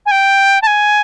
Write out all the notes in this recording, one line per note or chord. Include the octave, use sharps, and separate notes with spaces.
G#5
G5
A5
G#5